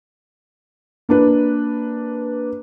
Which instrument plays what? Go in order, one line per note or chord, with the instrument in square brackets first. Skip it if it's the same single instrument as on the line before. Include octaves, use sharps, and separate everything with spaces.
[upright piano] A#3 D4 B4